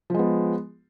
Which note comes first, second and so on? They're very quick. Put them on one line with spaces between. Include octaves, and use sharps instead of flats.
F3 G#3 B3